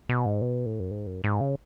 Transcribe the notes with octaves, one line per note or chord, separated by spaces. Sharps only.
B2
G#2
B2
A2
F#2
G#2
F#2
G#2
C#3